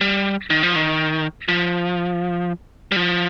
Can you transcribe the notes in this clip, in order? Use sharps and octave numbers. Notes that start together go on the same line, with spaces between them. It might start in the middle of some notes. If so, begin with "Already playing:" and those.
G3
D#3
F3
D#3
F3
G3
F3